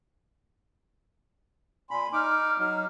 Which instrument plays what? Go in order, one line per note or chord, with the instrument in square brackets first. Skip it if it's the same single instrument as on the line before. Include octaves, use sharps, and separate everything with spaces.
[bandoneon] A#2 B5 [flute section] G#5 C6
[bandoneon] D#4 D6 [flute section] F6
[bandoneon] F#3 D#4